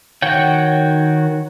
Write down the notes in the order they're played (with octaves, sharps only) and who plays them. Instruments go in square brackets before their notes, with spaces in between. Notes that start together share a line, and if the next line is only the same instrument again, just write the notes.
[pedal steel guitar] D#3 F#4 C#5 F#5 G5